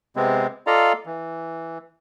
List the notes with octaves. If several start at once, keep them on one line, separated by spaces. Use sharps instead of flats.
C3 G#3 B3 C4
F4 A4 D5 D#5 F5 A#5
E3